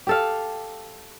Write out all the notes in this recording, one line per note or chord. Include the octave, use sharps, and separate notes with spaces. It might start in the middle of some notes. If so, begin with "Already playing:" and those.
G4 A4 F5